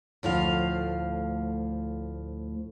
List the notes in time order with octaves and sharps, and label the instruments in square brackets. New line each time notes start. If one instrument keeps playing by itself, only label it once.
[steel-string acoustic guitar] D2 A2 F3 F5